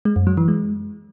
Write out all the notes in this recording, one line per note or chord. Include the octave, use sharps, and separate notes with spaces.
G#3
F#2
F#3
E3
G#3